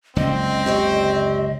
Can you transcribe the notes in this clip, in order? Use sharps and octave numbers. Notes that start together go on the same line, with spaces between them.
F#1 C#2 D3 C4 D#5
G4 C#5 D5